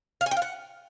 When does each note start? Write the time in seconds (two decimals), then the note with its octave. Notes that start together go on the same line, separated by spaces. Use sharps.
0.21 F5
0.26 G#5
0.31 G5
0.37 F5
0.42 F#5